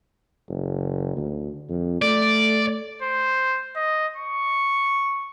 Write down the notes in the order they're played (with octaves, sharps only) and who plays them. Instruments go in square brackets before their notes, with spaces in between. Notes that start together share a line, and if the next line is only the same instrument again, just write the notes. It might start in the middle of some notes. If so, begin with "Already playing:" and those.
[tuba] F#1
D2
F2
[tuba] A3 [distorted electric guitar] D5
[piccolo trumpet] C5
D#5
C#6